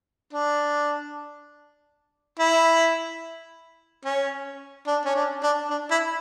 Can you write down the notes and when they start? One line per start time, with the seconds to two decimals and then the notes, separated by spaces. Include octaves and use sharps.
0.33 D4
2.39 E4
4.05 C#4
4.87 D4
5.05 C#4
5.16 D4
5.43 D4
5.70 D4
5.91 E4